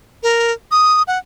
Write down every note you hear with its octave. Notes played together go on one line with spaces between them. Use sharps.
A#4
D#6
F#5